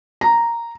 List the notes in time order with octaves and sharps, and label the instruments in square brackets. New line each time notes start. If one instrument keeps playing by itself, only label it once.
[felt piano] A#5